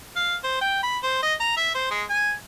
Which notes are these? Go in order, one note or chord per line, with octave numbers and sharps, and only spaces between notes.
F5
C5
G5
B5
C5
D#5
A#5
E5
C5
G#3
G#5